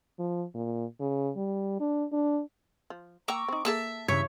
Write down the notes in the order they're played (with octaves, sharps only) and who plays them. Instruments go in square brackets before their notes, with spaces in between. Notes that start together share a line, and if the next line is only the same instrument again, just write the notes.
[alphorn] F3
A#2
C#3
G3
D4
D4
[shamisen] F3
[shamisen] A#3 G5 [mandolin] A#5 C#6 E6 [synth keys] D6
[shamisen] C4 D#4
[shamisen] A#3 G#4 A4 [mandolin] E5 A5 E6
[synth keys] G2 C#3 E3 [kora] C#5 [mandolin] E5